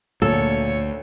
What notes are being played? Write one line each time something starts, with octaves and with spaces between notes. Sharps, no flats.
D2 A#2 A4 C#5 C#7